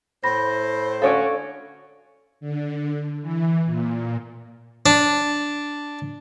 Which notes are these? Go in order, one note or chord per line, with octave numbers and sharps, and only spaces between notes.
A2 C5 B5 A#6
D3 C#4 F#4 A4 C#5 D5 F5
D3
E3
A#2
D4